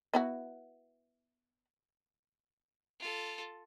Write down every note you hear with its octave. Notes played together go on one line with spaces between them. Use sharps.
B3 E4 F#4
F4 A4